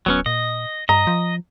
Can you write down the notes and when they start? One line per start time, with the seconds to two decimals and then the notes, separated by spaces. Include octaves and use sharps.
0.06 D1 F#3 B3 C#4
0.26 A#2 D#5
0.89 G2 D#5 A#5
1.07 F3